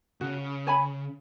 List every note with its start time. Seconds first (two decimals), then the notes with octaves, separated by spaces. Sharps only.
0.21 C#3 F#4
0.67 C#5 G#5 B5